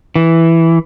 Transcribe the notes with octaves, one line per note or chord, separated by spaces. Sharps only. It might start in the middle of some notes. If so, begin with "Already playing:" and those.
E3